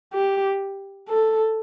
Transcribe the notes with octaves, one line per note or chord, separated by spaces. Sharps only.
G4
A4